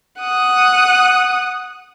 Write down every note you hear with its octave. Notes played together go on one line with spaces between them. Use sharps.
F#5 D#6